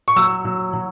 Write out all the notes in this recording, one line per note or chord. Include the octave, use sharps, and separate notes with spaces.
C#6
F#3 E6
F#3
F#3